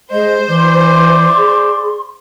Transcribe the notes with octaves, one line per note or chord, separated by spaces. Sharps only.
G#3 C5 D#5
E3 D5 C6
G#4